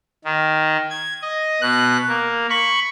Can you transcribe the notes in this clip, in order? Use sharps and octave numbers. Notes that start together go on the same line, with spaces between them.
D#3
G#6
D#5
B2 F#6
A#3
B5 C#6